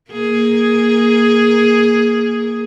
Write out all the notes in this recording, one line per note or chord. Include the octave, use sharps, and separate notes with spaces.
A#3 G#4